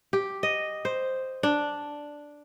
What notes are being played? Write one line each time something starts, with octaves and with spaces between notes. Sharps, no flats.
G4
D#5
C5
D4